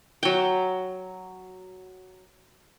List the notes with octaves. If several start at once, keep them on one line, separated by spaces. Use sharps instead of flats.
F#3 G5